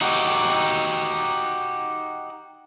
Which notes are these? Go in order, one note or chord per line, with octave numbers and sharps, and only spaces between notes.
D#4 F#4 G4